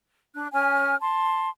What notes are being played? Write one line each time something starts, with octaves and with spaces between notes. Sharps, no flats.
D4 F#6
C#4 G#5 F6
A5 C6